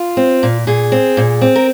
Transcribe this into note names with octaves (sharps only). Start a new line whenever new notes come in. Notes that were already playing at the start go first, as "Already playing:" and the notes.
Already playing: F4
C4
A#2
A#2 G#4
C4
A#2
C4
A#4